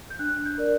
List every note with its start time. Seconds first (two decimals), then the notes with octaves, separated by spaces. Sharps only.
0.10 G6
0.19 D4 F#6
0.45 G6
0.58 A#4 D5